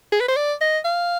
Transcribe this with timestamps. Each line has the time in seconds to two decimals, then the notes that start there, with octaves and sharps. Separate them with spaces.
0.13 G#4
0.20 B4
0.28 C5
0.36 D5
0.61 D#5
0.85 F5